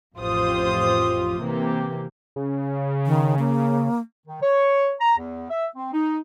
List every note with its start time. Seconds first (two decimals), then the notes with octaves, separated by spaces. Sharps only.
0.17 A1 F2 F4 G4 C5 D#6
1.40 C3 E3 A#3 G4
2.36 C#3
3.06 D#3
3.39 A#3
4.26 D#3
4.42 C#5
5.00 A#5
5.18 E2
5.50 E5
5.76 C4
5.93 D#4